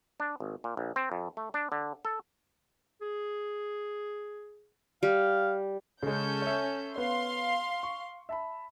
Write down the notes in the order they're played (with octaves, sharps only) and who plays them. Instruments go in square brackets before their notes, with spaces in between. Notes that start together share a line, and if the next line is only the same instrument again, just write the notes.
[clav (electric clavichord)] D4
G#1
A#2
A#1
C4
F2
A3
D4
D3
A4
[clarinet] G#4
[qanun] G3 [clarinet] F5
[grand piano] C#3 G#3 [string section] C#4 A4 G6
[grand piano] C#5 E5
[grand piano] B3 C#5 [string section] F5 C6
[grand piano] C#6
E5 A5 B5